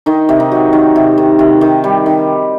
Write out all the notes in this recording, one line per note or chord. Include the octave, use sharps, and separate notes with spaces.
D#3 D#4
C3
D#4
F#3
D#3
C3
D#3
C3
D#3
G3
D#3